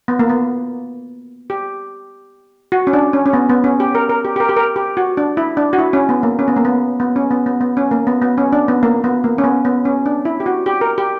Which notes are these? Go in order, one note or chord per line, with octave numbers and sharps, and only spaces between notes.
B3
A#3
B3
G4
F#4
C#4
D4
C#4
C#4
B3
B3
C#4
G4
A#4
A#4
G4
G4
A#4
G4
A#4
G4
F#4
D4
E4
D4
F#4
E4
C#4
B3
A#3
C#4
B3
A#3
B3
B3
C#4
B3
B3
B3
C#4
A#3
B3
B3
C#4
D4
B3
A#3
B3
A#3
C#4
B3
B3
C#4
D4
E4
G4
F#4
G4
A#4
G4